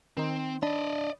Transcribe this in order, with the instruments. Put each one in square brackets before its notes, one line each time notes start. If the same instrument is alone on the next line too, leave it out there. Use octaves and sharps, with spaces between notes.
[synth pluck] D#3 D#4 [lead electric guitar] C4
[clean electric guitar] D4 [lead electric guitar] D5 D#5 [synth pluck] B5